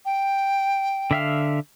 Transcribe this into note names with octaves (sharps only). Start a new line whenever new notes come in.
G5
D3 E5 F5